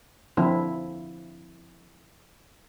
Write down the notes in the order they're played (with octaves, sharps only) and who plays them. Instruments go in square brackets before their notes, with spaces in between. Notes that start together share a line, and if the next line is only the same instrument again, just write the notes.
[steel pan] D3 F3 C4 E4